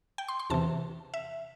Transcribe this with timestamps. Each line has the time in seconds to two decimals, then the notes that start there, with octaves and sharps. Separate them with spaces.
0.18 G5
0.28 C6
0.40 C6
0.50 E2 C3 E3 A5
1.14 E5